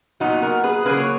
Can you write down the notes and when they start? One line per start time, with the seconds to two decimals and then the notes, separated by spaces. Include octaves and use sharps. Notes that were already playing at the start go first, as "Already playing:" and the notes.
0.20 A#2 F#3 B3 D#4 F#4
0.42 F#4 A#4
0.63 G#4 B4
0.85 C#3 F#3 A#3 G#4 B4
0.97 C#5